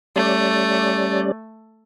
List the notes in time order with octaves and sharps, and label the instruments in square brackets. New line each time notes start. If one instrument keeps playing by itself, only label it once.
[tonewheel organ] G3 C#4 D5 [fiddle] A3